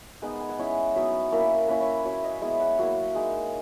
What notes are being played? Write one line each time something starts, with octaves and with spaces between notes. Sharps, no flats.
G#3 B3 D#4 F#5
G#5
F#5
G#3 C#4 E4
F#3 B3 D#4 E5
A#3 C#4 E4 A#4
A#3 C#4 E4 B4
C#5
F#3 C#4 E4 C#5
D#5
G#3 B3 E4 E5
F#5
F#3 A#3 E4
G#3 D#4